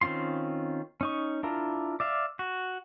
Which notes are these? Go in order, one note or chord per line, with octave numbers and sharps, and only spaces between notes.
D#3 C4 C#4 F4 C6
C#4 D#4 C#6
D4 E4 F4 A#4
D5 E5 F5
F#4